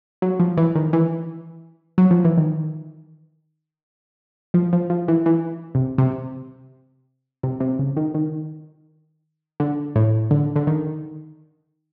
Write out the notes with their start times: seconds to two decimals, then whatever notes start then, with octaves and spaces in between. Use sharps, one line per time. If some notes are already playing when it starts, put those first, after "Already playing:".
0.22 F#3
0.40 F3
0.57 E3
0.75 D#3
0.93 E3
1.98 F#3
2.11 F3
2.25 E3
2.38 D#3
4.54 F3
4.73 F3
4.90 F3
5.08 E3
5.26 E3
5.75 C3
5.98 C3
7.43 C3
7.60 C3
7.79 C#3
7.96 D#3
8.14 D#3
9.60 D3
9.96 A2
10.31 D3
10.56 D3
10.67 D#3